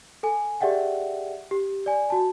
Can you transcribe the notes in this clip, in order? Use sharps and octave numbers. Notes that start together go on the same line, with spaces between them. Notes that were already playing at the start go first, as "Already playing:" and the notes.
A4 G#5
G4 G#4 D5 E5 F#5 G5
G4
D5 G#5
F#4 A5